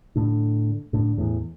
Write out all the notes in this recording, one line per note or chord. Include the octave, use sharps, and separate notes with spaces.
A2 D3
A2 D3
E2 A2